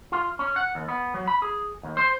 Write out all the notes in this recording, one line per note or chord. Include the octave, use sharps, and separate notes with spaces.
F4
C#4
F#5
D#2
B3
F#3
B5
G#4
D#2
C5